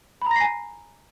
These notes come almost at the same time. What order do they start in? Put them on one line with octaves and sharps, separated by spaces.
B5 A#5 A#6 C7 G#5